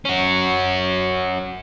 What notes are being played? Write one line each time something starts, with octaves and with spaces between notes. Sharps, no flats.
C#4 F#4